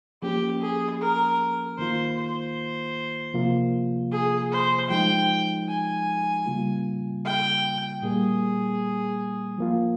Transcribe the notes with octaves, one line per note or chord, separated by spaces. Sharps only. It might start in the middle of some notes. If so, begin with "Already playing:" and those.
F3 A#3 C#4 G4
G#4
A#4
D#3 A#3 F4 C5
C5
C3 F3 A#3 F4
G#4
C5
F3 G#3 D#4 G5
G#5
C#3 G3 A#3 F4
G5
A#2 G3 A#3 G#4
F3 A#3 F4